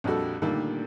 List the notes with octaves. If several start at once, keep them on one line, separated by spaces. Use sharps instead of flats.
A#1 F2 G3 F#4 A4
A#2 D3 D#3 G3 A3 A#3